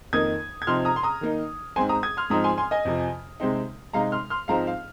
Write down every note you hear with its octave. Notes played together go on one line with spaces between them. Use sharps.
F2 D#3 A#3 D#4 D#6 G#6
G#6
C3 F3 C4 D#4 C6 F6
A#5 D#6
C6
A#5 D#6
D#3 A#3 D#4
G#2 G#3 C4 G#5 C6
A#5 D#6
D#6 G#6
C6 F6
G#2 F3 C4 D#4 A#5 D#6
G#5 C6
G#5 C6
D#5 G#5
F2 C3 F3
C3 G#3 C4 D#4
C3 G#3 D#4 F5 A#5
C6 F6
C6 F6
G#2 F3 G#3 C4 D#4 F5 A#5
F5